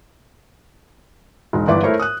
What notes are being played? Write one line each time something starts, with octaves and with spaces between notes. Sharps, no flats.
E1 D#4
G1 E3 B4 D5 D6
A3 E4 A#4 C5 C#5
D#6 F#6